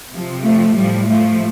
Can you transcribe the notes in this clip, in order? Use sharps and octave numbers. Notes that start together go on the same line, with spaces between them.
C3 F3
F3 A3
A2 F3 G3
F3 A3